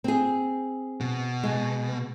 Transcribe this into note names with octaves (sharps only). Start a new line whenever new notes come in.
C4 G#4
B2
G#3